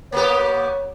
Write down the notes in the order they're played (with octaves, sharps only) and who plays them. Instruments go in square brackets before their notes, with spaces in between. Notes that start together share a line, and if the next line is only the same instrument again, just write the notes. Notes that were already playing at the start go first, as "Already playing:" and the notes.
[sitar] A#3 B3 G4 [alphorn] C#5